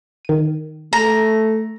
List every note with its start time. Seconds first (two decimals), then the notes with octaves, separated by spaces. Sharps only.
0.25 D#3 D#7
0.93 A3 A#5